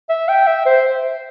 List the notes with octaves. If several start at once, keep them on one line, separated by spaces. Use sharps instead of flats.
E5
G5
E5
C5